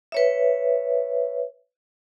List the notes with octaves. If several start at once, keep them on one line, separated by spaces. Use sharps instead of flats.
B4 C#5 E5